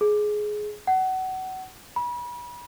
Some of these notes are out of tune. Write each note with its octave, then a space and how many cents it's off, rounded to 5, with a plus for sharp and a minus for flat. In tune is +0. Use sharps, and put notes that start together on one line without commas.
G#4 +15
F#5 +25
B5 -35